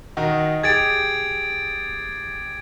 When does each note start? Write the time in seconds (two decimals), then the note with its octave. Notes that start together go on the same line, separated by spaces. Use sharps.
0.17 D#3 D#4 F#4
0.63 G4 G#4 G#6 A6 D7